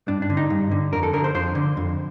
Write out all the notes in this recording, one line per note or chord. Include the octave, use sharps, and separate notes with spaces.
G2 D4
D4
D3
D#4
G2
D3
F2 A#4
A4
D3 A#4
C5
F2 C5
D3
F2